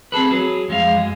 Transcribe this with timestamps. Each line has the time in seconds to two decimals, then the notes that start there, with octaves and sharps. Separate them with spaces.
0.12 C4 G#4 A4 B4
0.31 F#3 G#4
0.68 F2 G#3 F4 F5
0.95 F#2 G#3